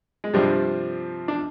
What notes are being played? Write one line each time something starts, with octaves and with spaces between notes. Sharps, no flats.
G#3
G2 C3 F3 G3 C4
D4